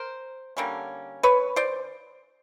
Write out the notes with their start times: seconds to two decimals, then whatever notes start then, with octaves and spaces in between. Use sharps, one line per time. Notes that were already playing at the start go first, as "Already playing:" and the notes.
Already playing: A#4 C5
0.57 D3 G3 A#3 C#4
1.23 B4 C#5
1.56 C5 D5